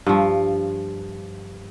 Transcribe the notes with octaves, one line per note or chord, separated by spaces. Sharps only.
G2 F3